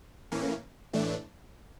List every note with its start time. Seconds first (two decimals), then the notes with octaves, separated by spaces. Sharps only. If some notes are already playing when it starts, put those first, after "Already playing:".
0.32 A2 E3 A#3 C#4
0.93 A2 E3 A3 D4